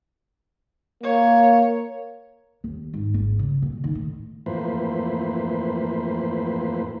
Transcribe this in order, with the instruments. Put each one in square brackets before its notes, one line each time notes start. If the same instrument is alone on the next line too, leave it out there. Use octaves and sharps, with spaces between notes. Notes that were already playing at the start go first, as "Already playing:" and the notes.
[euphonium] A#3 [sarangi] C#5
[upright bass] D#2
G#2
G#1
C#3
A#2
D#3
A2
[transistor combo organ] F2 A2 E3 A#3 B4 C5